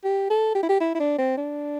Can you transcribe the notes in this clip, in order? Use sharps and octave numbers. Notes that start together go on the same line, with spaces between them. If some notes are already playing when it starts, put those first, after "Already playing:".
G4
A4
G4
E4
G4
E4
E4
D4
C4
D4